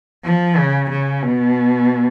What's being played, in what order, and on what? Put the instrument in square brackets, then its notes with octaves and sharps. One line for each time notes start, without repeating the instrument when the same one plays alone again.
[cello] F3
C#3
C#3
B2